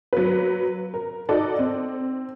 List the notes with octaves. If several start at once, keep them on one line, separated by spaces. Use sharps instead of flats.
F#3 A#3 B4
A#4
D#4 F#4 A4 D5
C4